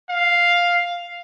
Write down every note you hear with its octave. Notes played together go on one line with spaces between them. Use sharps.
F5